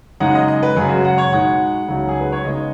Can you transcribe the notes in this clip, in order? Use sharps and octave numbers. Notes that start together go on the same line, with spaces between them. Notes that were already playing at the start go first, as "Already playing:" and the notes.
F#2 C#3 G#3 D#4 F#5
D#5
D#5
B4
F#2 C#3 G#3 G#4
F#4
F#5
C#5
B2 G#3 D#4 F#5
C#2 C#3 F#3 D#4
G#4
B4
C#5
C#3 G#3 B3 D#4 D#5